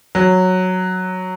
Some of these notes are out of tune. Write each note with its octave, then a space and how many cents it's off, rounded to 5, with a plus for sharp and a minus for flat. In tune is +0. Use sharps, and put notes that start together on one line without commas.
F#3 -5